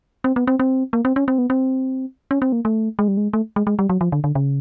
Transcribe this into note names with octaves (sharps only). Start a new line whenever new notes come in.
C4
B3
C4
C4
A#3
C4
C#4
C4
B3
C4
C#4
C4
A#3
A3
G#3
G3
G#3
A3
G#3
G#3
G3
F#3
F3
D3
D3
C#3